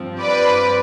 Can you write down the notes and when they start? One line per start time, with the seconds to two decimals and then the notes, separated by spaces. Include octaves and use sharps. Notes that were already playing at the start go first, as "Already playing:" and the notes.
Already playing: G2 F3 C4
0.21 B4 D5